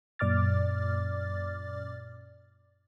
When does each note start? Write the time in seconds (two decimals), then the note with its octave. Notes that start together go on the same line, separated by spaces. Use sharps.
0.19 F#2 A#2 D5 D6 F6 A6